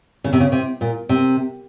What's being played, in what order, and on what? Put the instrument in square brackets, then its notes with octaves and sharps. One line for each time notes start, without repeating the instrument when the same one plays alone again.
[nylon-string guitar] C#3
C3
C#3
C3
A#2
C3